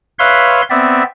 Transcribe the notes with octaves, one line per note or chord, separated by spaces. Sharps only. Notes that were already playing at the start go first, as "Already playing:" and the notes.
B4 C#5 E5 F5 C6 F#6
B3 C4 D5 E5